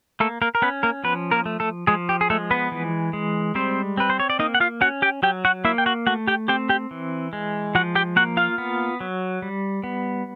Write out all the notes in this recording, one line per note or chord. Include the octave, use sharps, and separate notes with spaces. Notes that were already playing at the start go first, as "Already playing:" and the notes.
A3 A#3 A4
A#3 A#4
A#4
B3 C#4 B4
A#3 A#4
F3 B3 B4
A#3 A#4
A3
A3 A4
F3 G#3 G#4
G4
G#4
G#3 A3 A4
B3 B4
E3
G#3
G3 C4 C5
C4 B4
C5
C#5
D5
A#3 D#4 D#5
F#5
F4 F5
C#4 F#4 F#5
G4 G5
F#3 G4 G5
F#4 F#5
A#3 E4 E5
G5
F#4 F#5
A3 F#4 F#5
G4 G5
C4 G4 G5
G4 G5
E3
G#3
F3 F#4 F#5
G4 G5
A#3 F#4 F#5
F4 F5
B3
F#3
G3
B3